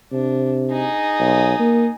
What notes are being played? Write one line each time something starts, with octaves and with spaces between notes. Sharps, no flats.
C3 D4
D#4 G#4
B1
A#3